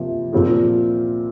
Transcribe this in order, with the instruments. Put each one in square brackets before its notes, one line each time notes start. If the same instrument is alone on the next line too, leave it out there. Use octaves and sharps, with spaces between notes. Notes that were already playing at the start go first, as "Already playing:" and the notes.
Already playing: [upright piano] C3 F3 A#3
A#2 F3 C4 F4 G#4